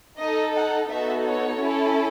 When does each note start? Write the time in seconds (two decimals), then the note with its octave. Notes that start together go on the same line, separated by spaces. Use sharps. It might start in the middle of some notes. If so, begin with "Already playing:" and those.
0.19 D#4 A4 D#5
0.54 F#5
0.89 B3 D#4 F#4 A4 E5
1.25 C#5
1.60 C#4 E4 A4